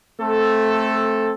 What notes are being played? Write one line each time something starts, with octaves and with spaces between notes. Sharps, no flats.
A3 C4 A4